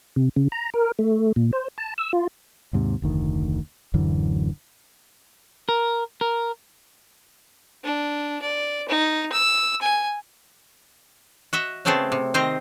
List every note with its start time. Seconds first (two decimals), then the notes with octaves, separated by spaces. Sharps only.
0.16 C3
0.36 C#3
0.52 A#5
0.74 A#4
0.99 A3
1.36 A#2
1.53 C5
1.78 A5
1.98 E6
2.13 F4
2.73 D#2 G#2 C3
3.02 F1 D2 D#3
3.94 D1 F#2 D3 E3
5.69 A#4
6.21 A#4
7.84 D4
8.42 D5
8.89 D#4
9.32 E6
9.82 G#5
11.53 F#4 D#5 E5
11.85 C#3 A3 B3 C4 G#4 A4
12.12 C3
12.34 D#3 C4 C5 D#5 A#5